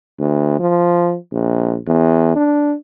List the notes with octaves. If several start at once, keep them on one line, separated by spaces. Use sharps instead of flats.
D2
F3
A#1
E2
D4